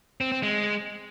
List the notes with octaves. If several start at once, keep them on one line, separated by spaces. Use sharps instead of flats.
C4
C4
G#3